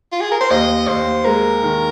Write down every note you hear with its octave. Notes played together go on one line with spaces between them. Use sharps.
F4
G#4
A#4
C5
D#2 D#5
D#2 C5
G#3 A#4
D#3